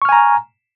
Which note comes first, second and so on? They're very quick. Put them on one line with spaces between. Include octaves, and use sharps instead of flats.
C#6 F6 G#5 A#5